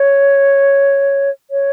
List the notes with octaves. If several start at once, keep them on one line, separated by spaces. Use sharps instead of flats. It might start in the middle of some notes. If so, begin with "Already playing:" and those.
Already playing: C#5
C#5